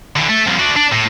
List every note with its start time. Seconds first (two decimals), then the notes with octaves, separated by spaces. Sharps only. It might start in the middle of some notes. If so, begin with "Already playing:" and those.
0.16 D3 E3
0.29 A3
0.47 C2 F3
0.59 D4 F#4
0.76 D4
0.93 A2